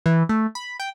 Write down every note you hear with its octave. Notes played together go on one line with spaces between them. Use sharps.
E3
A3
B5
G5